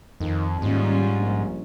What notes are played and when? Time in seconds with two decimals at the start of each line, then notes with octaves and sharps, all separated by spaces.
0.21 F2 D#3
0.62 D#1 G#2 G3 C#4 F4
1.19 A#1